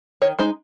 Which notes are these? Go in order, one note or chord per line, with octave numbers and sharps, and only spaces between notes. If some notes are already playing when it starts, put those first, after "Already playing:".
D#3 C#5
G#3 D#4 C5